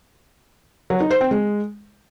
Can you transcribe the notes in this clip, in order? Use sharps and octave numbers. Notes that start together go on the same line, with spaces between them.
F#3
D#4
C5
C4
G#3